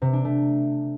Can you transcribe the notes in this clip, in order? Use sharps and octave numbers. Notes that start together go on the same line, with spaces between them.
C3
D4
A3